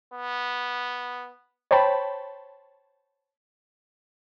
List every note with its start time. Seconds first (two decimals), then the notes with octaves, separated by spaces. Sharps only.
0.14 B3
1.71 C5 C#5 G5 A5 B5